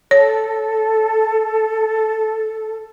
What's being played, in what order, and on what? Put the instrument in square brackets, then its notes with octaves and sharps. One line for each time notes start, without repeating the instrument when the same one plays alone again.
[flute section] A4 [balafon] C#5